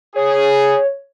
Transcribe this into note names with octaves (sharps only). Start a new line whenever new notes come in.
G#4 C#5